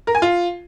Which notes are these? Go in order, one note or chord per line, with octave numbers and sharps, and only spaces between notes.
A#4
G#5
F4